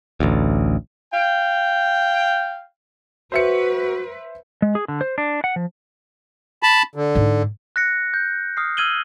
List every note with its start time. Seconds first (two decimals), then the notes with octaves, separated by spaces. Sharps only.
0.20 A1 D2
1.12 F5 G5
3.32 F#4 B4 C5 E5 C#7
4.62 G#3
4.75 G#4
4.88 D3
5.01 C5
5.18 D4
5.44 F#5
5.56 F3
6.63 A5 B5
6.95 D3
7.15 G#2 D#4
7.76 F#6 A#6 C#7
8.14 G6
8.57 D#6 F6 C7
8.77 E6 F6 G#6 D#7 F#7 G7